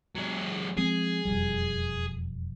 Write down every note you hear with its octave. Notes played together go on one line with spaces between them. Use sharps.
F#3 G#3
F3 G#3 C4 G#4
E1 F2 G3